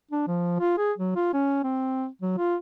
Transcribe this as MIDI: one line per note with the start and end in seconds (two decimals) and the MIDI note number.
0.11 0.24 62
0.27 0.59 53
0.60 0.75 65
0.78 0.92 68
0.98 1.13 54
1.16 1.32 65
1.34 1.59 61
1.64 2.06 60
2.22 2.33 54
2.38 2.55 65